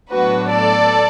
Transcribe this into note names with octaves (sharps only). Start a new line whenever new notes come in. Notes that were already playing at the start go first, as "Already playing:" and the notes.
A2 F#3 B3 D4 F#4 B4
A4 D5